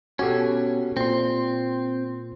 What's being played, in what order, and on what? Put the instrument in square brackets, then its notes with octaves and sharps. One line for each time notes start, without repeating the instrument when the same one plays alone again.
[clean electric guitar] B2 C#4 [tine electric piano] F#4 G4 A4
[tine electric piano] A#2 C6 [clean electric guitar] C4